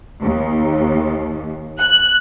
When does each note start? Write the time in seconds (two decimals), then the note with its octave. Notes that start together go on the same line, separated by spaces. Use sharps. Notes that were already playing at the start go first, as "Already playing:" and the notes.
0.23 D#2
1.80 F#6